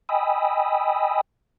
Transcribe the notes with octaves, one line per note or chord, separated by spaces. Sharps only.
D#5 G5 G#5 B5 D#6 E6